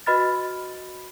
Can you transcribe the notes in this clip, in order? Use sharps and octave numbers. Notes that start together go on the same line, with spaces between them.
F#4 B4 D#5 B5 F6 A6